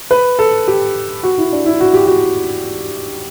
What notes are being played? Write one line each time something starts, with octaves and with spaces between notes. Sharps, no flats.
B4
A4
G4
F#4
E4
D4
E4
F#4
G4
F#4